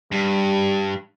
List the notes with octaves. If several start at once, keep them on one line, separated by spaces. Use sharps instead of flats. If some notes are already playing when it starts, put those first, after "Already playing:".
G2 G3